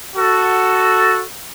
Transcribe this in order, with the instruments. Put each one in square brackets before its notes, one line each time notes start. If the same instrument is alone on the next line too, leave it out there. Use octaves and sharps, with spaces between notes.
[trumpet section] F#4 A4